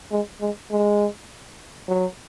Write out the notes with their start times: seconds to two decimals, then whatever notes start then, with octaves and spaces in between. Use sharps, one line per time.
0.11 G#3
0.41 G#3
0.71 G#3
1.88 F#3